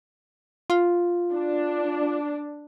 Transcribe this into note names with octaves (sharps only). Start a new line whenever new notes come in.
F4
D4